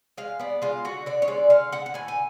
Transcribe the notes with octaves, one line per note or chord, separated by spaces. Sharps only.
G#3 F5
B3 D5
G#3 F4
D3 F#4
D3 D5
C#5
G#3 D5
D3 F5
D3 F#5
F#5
A2 G#5
G#5